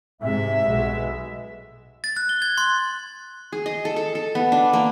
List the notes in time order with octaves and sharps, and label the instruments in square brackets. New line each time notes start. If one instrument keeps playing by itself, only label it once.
[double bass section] G#2 C3 G#3 [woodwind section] E5
[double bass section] B1 B2 G#3
[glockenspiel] A6
F#6
G7
G#6
C6
[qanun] G#4
D#5
A4
A4
A4
B3
D4
A#3